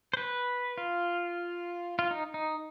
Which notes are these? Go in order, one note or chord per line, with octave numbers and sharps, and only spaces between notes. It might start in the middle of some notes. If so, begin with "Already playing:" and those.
C5
B4
F4
F4
D#4
D#4